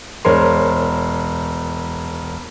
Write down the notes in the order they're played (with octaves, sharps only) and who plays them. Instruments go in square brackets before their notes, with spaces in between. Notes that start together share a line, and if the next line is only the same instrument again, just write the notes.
[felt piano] E1 A#4 C5 C#5 C6